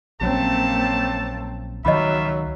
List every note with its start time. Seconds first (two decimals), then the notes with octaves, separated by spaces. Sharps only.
0.21 A#1 F#3 A3 A#3 C4 C#4 A5
1.85 C#2 D#3 F#3 G3 F4 D#5 E5 B5